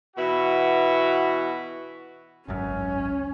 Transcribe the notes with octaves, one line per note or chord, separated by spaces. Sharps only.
B2 E3 E4 F#4
G#1 C#2 F#2 C#4